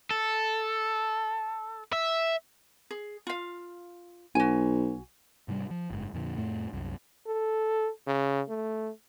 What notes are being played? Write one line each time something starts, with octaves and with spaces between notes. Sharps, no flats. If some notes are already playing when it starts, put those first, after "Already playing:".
A4
E5
G#4
F4 F5
B1 F#4 G#5
G#2 C3 D#3 G3
F3
F#1 G#2
F2 A#2 D3
F2 A2 A3
C2 F#2
A4
C#3
A3